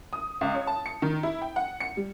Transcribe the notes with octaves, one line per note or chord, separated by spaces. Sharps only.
D#6
C#2
C#5
A5
C#7
D#3
E4
G5
F#5
C#7
G3